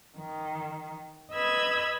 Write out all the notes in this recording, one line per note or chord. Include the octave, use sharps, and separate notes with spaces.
D#3
B4 D#5 B5 E6 G#6